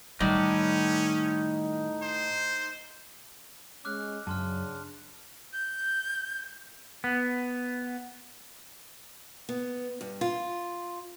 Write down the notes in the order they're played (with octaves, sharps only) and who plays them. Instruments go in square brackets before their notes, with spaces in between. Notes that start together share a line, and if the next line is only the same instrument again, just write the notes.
[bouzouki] A2 [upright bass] D#3 G3 [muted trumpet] C#4 [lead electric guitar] D#4 D5
[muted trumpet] C5
[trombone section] G#3 C#4 [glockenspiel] D6 F6 F#6
[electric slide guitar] F#2 [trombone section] C#3 D4 [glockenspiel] A5 C6 F6
[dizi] G6
[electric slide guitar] B3
[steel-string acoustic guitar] B3
G2
F4